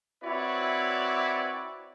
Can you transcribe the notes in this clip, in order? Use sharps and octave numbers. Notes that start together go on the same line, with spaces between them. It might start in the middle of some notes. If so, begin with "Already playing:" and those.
C4 E4 F#4 B4 C#5 D5